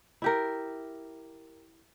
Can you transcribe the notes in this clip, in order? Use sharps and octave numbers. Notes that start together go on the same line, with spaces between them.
E4 G4 A#4